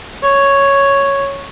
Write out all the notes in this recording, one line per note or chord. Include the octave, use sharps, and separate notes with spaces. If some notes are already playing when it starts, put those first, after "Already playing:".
C#5